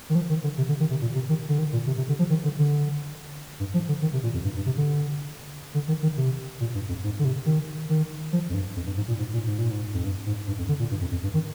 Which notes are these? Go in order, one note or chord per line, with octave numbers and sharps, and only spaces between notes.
D#3
F3
D#3
D3
C3
D3
D#3
C3
A#2
C3
D#3
D3
D#3
A#2
C3
C3
D3
F3
D#3
D3
D3
G2
F3
D3
D#3
C3
A#2
F2
G2
G2
C3
D3
D3
D#3
D#3
C3
A#2
G2
F2
G#2
D3
C3
D#3
D#3
F3
F2
G2
F2
G2
G#2
A#2
G#2
A#2
G#2
A#2
G#2
F2
G2
G#2
G2
F2
D3
A#2
G2
F2
F2
G2
D#3